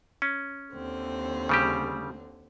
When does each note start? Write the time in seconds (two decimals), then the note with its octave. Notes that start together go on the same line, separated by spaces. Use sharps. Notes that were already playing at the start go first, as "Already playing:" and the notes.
0.22 C#4
0.73 D#2 D3 C4
1.49 C#3 G3 G4